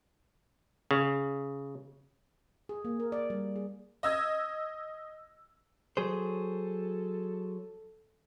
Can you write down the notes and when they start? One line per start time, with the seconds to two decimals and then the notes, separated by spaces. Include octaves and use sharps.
0.91 C#3
2.69 G#4
2.85 A#3
3.00 A#4
3.12 D5
3.30 G3
3.56 G#4
4.03 D#5 E6 G#6
5.97 F#3 G#4 A4 C5